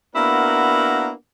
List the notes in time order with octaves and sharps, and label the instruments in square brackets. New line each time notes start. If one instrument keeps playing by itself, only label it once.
[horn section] A#3 B3 D4 E4 F#4 A#4